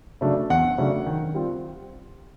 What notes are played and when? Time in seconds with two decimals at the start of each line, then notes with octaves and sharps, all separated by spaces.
0.21 C#3 F#3 A3 D4
0.50 E2 F#5
0.78 C#3 F#3 A3 D4
1.06 D#3
1.34 G3 C4 F4